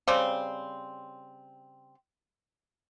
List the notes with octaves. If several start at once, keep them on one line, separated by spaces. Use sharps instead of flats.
C#3 G3 C4